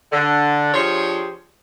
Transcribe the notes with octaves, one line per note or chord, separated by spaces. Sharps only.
D3
F3 D4 G4 G#4 C5 C#5